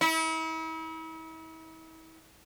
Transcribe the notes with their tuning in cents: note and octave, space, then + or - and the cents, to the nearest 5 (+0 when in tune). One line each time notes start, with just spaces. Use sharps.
E4 -40